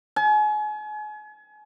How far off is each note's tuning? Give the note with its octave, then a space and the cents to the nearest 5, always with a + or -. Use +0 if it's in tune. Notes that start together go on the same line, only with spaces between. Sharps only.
G#5 +35